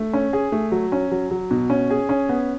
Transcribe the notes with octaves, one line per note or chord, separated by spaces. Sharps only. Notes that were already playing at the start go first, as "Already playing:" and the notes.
Already playing: A3
C#4
G#4
A3
F#3
C#4
F#3
F#3
B2
C#4
G#4
C#4
B3